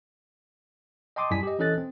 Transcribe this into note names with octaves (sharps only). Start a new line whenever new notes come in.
D#5 G5 A5 C6 D6 D#6
F#2 G3 E4 G4 G#5 B6
G4 D#5
E3 C#4 A4 D#5 F#6 A6
C4